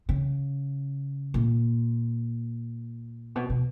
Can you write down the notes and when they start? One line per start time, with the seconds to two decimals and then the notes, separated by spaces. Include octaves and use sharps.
0.09 C#3
1.34 A#2
3.35 B2
3.50 B2